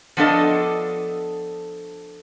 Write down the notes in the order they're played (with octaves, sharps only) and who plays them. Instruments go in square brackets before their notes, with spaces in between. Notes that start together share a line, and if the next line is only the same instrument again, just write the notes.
[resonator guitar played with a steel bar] F3 B3 D4 A4 D#5